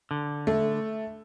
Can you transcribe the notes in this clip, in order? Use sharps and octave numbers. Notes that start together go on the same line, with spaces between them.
D3
A3